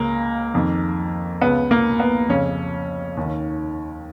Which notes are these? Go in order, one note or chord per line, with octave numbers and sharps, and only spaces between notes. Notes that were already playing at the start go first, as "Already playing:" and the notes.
Already playing: C#2 C#3 A#3
F2 D#3
C#2 C#3 B3
A#3
B3
F2 C#3 C#4
D#2 D#3